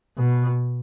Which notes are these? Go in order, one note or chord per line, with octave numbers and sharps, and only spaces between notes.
B2